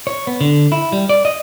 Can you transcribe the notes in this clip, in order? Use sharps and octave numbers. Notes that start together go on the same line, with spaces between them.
C#5
B3
D3
E4
G3
D5
D#5